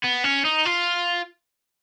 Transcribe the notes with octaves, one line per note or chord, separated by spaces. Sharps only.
B3
C#4
D#4
F4